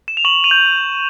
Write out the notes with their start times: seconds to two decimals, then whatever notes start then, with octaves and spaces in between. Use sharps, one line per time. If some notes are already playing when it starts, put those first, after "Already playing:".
0.08 E7
0.17 F7
0.25 C#6 E7 F#7
0.44 D#7 F7
0.51 G6